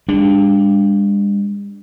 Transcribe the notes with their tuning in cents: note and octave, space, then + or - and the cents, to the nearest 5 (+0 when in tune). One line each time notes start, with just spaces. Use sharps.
G#3 -45 D4 +0